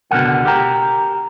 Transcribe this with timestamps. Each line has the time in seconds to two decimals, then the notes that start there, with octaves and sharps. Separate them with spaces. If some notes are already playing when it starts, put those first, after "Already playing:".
0.11 C#2 B2 D3 E3 A#4 F#5
0.45 G4 A#4 G5 A#5